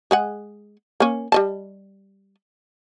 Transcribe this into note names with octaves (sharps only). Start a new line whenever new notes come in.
G#3 G#4 F#5
A#3 C#4
G3 D#5 A5